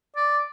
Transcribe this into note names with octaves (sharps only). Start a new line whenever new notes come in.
D5